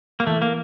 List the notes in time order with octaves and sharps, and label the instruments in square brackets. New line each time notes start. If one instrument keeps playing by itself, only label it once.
[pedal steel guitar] A#3
[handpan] E3 [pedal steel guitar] A3
[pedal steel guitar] A#3